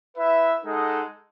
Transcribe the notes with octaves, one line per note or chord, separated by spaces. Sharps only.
E4 B4 E5
G#3 D#4 A4 D#5 F#5